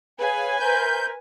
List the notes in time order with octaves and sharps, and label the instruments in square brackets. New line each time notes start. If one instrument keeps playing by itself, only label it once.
[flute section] G#4 C#5 F5 [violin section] B4 G#5
[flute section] A#4 C5 E5 [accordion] G6